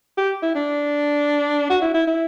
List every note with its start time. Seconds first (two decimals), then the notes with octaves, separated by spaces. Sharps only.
0.18 G4
0.42 E4
0.55 D4
1.70 F#4
1.81 E4
1.94 E4
2.07 E4